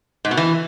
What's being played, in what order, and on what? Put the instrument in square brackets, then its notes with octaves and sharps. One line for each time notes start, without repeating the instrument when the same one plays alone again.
[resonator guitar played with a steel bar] G#2
B2
E3